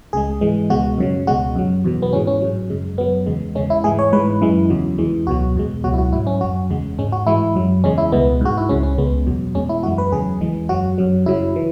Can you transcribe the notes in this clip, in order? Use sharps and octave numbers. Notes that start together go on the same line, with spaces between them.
C#2 C#3 G#3 G#4
G#2 E3 G#3
C#2 B2 G#3 F#4
F#2 C#3 F#3
C#2 B2 G#3 F#4
F#2 F#3
E2 B2 F#3
B3
G#2 E3 G#3 C#4
C#4
G#2 F#3
F#2 C#3 G#3
F#2 F#3 B3
E2 C#3 G#3
E2 C#3 G#3 C#4
E4
G#2 E3 G#3 G#4
C#5
G#2 E3 G#3 B4
F#2 E3 G#3
E2 C#3 F#3
E2 E3 G#3
C#2 B2 F#3 F#4
E2 B2 G#3
C#2 B2 F#3 F#4
E4
F#4
G#2 F#3 E4
C#4
F#2 F#3 F#4
E2 C#3 G#3
G#2 G#3 C#4
F#4
G#2 E3 G#3 E4
F#2 F#3
E2 C#3 G#3 C#4
E4
C#2 B2 G#3 B3
G#2 G#3 F#4
E4
C#2 C#3 G#3 C#4
C#4
C#2 C#3 G#3 B3
E2 B2 F#3
E2 B2 G#3 C#4
E4
F#2 E3 G#3 F#4
B4
E2 C#3 F#3 G#4
E2 E3 G#3
F#2 F#3 F#4
F#2 F#3
F#2 C#3 F#3 E4
E3